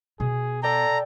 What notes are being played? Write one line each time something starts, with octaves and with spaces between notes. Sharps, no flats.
B2 G#4
A4 D5 G5 A#5